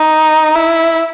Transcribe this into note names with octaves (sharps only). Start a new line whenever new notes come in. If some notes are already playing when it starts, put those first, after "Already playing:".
Already playing: D#4
E4